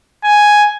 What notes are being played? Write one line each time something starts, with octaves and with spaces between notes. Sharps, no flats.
G#5